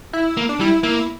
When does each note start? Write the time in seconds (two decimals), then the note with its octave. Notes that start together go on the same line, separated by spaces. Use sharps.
0.13 E4
0.37 A#3
0.49 D4
0.60 G3 E4
0.83 A#3 E4